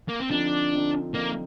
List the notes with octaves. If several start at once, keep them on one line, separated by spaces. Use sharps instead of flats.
A#3
C4
D3 F3 C4 D4 D#4
D3 F3 C4 D#4
D3 F3 A#3 C4 D#4